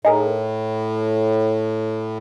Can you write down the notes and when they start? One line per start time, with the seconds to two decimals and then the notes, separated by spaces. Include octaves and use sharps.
0.05 A2 D#4 G#4 A#4